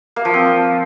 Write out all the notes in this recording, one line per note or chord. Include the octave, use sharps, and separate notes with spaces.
A#3
F3
C4